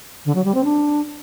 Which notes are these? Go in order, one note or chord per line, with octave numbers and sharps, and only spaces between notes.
D3
F#3
G3
C4
D4